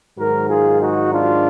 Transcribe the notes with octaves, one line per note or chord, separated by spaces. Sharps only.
G#2 D#3 F#3 F#4 A#4
F4 G#4
D#4 F#4
D4 F4